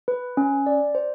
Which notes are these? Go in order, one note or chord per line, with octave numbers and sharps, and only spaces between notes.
B4
C#4
D5
C5